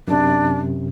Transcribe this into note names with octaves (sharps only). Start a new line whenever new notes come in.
F#2 C3 D4